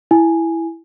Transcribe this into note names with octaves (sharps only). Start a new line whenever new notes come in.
E4 G#5